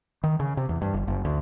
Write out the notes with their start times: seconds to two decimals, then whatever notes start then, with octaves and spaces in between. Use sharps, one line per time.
0.24 D#3
0.40 C#3
0.57 C3
0.69 E2
0.82 G2
0.94 G1
1.08 F#1
1.25 D2